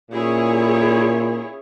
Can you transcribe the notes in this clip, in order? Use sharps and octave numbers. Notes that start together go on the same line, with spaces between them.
A#2 C#4 E4 G#4 C#5